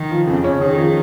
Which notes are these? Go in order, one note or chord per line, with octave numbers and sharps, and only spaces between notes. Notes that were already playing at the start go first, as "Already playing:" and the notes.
Already playing: D#3
F3
F2 C#3
C#4
D#3 G#4
F3